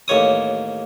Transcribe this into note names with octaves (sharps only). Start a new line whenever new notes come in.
A1 D#2 C#5 D#6